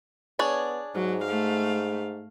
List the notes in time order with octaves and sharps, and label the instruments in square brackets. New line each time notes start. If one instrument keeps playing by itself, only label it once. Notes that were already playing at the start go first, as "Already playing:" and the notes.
[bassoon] B3 [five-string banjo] D4 G#4 C#5
[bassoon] G#2 [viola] F#3
[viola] A3 F5